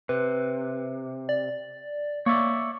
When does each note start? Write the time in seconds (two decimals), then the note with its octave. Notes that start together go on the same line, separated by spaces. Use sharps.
0.09 C3 B4
1.29 D5
2.26 A#3 C#5 D5 E5